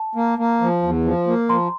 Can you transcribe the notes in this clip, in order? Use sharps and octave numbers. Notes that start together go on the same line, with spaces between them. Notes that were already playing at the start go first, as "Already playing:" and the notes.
Already playing: A5
A#3
A#3
F3
E2
F3
A#3
F3 A#5 C6